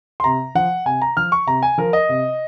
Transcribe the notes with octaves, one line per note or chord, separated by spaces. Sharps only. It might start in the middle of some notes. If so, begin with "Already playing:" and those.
C6
C3 A#5
F3 F#5
C3 G#5
A#5
F3 F6
C#6
C3 A#5
G#5
F3 A#4
D#5
C3